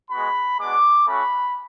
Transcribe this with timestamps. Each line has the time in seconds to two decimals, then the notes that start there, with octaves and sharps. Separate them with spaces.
0.11 G#3 B3 F#4 B5
0.59 G#3 B3 D4 F#4 D6
1.07 A3 C#4 F#4 B5